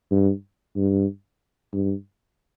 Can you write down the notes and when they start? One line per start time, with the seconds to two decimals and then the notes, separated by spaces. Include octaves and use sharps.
0.11 G2
0.76 G2
1.74 G2